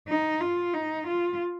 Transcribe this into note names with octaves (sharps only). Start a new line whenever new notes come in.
D#4
F4
D#4
F4